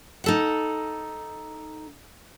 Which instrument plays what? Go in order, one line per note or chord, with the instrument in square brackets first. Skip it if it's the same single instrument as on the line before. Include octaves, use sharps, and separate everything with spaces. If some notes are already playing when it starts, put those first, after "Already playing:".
[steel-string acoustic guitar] D#4 A4 F#5